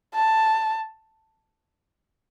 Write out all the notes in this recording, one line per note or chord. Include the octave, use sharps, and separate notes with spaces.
A5